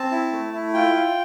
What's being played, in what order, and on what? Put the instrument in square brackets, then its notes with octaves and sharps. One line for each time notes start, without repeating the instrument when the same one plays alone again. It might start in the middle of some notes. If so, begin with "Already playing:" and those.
Already playing: [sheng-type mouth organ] C4 A5
E4
A3
E4
F4 G5
F4